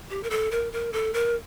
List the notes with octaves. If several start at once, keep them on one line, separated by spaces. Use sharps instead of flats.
G4
A#4
A4
A#4
A#4
A4
A#4